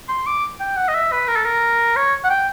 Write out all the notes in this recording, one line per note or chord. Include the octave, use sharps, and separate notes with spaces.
C6
D6
G5
F#5
D#5
E5
B4
A#4
A4
A#4
C#5
F#5
G5